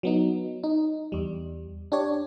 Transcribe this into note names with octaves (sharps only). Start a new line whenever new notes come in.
F#3 B3 D#4
D#4
E2 G3
D4 G4 C#5 D5